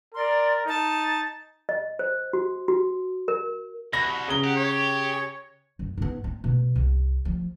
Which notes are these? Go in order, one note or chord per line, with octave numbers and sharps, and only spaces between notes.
A#4 D5 C6
D#4 A5
D#5
C5
F#4
F#4
A#4
C2 F#4 B5 A#6
C#3 A#5 G7
G4 F#5
C#5
F#2
G#2 B3
C4
B2
C2
F3